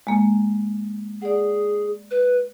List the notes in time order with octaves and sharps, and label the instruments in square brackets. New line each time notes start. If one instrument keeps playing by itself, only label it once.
[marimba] G#3 A#3
[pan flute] G#4 [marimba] D5 F#5
[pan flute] B4